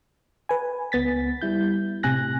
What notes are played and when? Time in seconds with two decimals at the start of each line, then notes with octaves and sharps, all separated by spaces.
0.49 B4 G#5
0.92 C#2 B3 A6 B6
1.41 G3 E4 G6
2.03 A2 C3 G#5 F#6 A#6